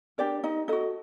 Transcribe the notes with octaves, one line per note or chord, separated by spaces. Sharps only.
D4 G4 A#4 D5
D#4 D#5
D#4 F#4 A4 D#5